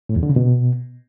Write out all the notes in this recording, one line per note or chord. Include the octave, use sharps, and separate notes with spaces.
A2
E2
D3
C#3
B2